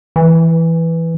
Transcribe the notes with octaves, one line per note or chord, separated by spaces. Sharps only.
E3